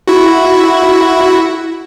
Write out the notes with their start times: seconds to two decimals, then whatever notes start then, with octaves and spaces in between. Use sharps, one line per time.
0.08 E4 F#4